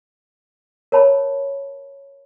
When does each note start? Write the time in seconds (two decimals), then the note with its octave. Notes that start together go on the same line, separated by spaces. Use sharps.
0.92 A#4 C#5 A5 B5